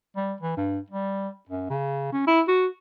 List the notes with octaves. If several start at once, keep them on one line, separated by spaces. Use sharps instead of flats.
G3
E3
G2
G3
F#2
C#3
C#4
E4
F#4